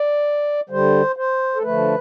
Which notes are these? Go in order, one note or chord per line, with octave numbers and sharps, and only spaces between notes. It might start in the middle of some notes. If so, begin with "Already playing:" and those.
Already playing: D5
D3 G3 C5
C5
A4
D3 F3 A3 B4